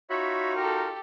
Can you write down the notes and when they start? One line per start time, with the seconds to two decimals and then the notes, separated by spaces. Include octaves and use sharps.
0.10 D#4 F4 F#4 C#5 E5 B5
0.56 G4 A4 A#4